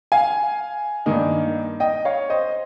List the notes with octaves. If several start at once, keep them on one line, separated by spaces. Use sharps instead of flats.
F5 G#5
G2 D#3 A#3 D#4
D#5 G5
C#5 F5
C5 D#5